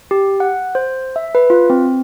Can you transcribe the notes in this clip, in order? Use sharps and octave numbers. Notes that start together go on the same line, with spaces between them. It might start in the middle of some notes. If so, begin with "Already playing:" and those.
G4
F#5
C5
E5
B4
F4
C4